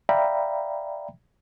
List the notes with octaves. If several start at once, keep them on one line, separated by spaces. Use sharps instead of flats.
D5 E5 F5 G5 A#5 B5